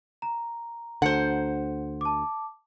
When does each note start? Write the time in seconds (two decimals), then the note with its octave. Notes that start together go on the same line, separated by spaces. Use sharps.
0.22 A#5
1.02 D2 D3 C5 F#5
2.01 A5 D6